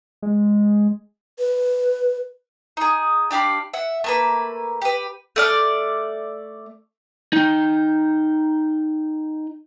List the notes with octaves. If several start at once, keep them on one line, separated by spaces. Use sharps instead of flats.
G#3
B4
D#4 G#4
D4 G4 F5 B5
E5 F#5
A3 A#3 B4
G4 B4
A3 D5 F6
D#4 G5